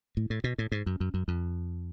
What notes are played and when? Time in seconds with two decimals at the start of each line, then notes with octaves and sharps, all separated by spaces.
0.17 A2
0.30 A2
0.44 B2
0.58 A2
0.72 G#2
0.86 F#2
1.00 F#2
1.14 F#2
1.28 F2